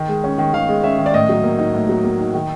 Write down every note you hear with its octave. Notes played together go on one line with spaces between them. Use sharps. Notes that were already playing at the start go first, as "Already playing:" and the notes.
Already playing: D#3
G#3
C#4
D#3
D#3 F5
G#3
C#4 E5
D#3
D5
A2 D#5
F#3
A#3
D#4
A2
F#3
A#3
D#4
D#3